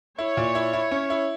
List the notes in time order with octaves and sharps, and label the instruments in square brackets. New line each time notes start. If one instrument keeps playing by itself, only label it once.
[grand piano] E4 [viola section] C#5
[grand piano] A#2
E4
E4
C#4
E4